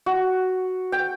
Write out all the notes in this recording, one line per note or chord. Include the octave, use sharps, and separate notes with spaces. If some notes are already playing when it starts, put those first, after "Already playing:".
F#4
G5